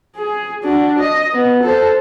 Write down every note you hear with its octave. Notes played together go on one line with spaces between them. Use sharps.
G#4
D4 F#4
D#5
B3
A4 C5